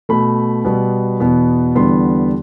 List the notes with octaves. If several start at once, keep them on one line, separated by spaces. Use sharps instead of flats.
B2 A3 B5
B2 G3 B3
E2 B2 B3
E2 D3 G3 B3 C6